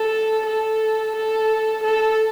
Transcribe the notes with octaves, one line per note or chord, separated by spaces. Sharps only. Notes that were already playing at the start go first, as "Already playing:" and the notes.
Already playing: A4
A4
A4
A4